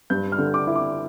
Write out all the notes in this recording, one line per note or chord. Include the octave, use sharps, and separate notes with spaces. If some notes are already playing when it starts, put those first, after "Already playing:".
G2 G6
F6
D3
D6
E4
D6